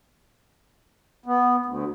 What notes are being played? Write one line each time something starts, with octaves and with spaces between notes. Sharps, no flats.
B3
D2